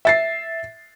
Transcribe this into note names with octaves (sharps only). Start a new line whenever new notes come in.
E5 A6 C7